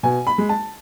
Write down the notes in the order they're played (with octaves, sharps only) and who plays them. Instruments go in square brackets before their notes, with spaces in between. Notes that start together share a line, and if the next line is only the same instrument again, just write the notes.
[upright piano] B2 G#5
B5
G#3
A5